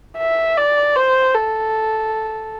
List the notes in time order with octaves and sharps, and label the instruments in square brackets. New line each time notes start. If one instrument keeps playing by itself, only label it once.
[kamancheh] E5
D5
C5
A4